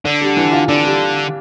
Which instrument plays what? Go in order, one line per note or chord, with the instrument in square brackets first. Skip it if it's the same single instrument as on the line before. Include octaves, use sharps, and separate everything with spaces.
[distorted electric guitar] D3 [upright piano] D4
[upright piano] G3
E3
F4
[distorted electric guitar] D3 [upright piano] D4
[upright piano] G3